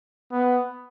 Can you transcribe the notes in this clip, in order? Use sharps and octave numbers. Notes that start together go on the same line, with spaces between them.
B3